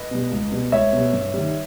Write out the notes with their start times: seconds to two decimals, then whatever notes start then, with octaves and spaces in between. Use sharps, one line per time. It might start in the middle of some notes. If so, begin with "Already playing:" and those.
Already playing: B4 D#5
0.11 B2 G3
0.31 C#2
0.52 B2 G3
0.72 C#2 C#5 E5
0.93 B2 G3
1.13 G2
1.34 D#3 G3